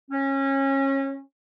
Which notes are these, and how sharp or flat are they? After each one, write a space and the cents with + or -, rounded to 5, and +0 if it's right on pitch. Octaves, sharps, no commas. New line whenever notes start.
C#4 -25